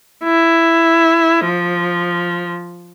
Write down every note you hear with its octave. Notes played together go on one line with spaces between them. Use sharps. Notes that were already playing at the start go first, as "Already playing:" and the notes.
E4
F3